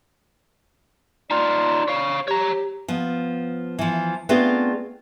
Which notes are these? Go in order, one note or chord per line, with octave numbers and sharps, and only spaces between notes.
D#4 F4 D5
C#5 F5
G4 C#5 A#5
F3 B3
E3 F3
A3 B3 C4 D4 F4 G#4